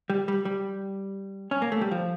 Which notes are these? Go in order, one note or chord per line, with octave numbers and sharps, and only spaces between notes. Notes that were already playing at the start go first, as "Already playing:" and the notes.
G3
G3
G3
C#4
A#3
A3
G3
F3